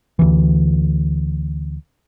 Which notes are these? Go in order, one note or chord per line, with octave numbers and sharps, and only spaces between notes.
D2 E3